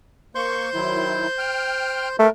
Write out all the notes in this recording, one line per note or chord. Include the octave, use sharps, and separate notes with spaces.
A#3 C5 C6 C#6 G6
D#3 F#3 E4
G5 F6
A3 A#4